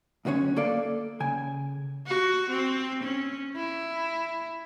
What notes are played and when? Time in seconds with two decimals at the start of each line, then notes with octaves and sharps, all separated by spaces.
0.25 B1 F#2 D3 C#4 C#5
0.56 A#3 A4 D5 F5
1.20 C#3 G#5
2.07 F#4
2.50 C4
3.03 C#4
3.56 E4